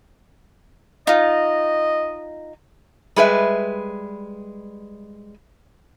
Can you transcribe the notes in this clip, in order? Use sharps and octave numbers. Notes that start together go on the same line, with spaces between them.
D#4 F4 D#5
G3 G#3 B4 E5